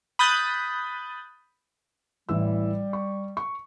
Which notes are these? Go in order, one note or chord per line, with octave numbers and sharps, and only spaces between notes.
B5 D#6 F#6 G6 A6
A1 E3 G3 E6
C#6
C#6